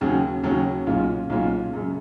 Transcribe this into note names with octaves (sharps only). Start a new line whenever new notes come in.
D#2 C#3 F#3 C#4 G#4
D#2 C#3 F#3 C#4 G#4
B1 A#2 G#3 C#4 F4
B1 A#2 G#3 C#4 F4
F#2 C#3 G#3